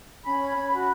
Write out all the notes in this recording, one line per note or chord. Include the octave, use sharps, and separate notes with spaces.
C#4 B5
C#5
C#4
F#4